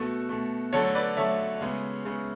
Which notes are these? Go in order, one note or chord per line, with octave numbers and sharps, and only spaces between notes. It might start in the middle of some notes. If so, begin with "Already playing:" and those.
Already playing: B2 A3 F#4 A4
B2 A3
D3 F#3 A3 A4 C#5
B4 D5
D3 F#3 A3 C#5 E5
C#3 G#3 B3
C#3 G#3 B3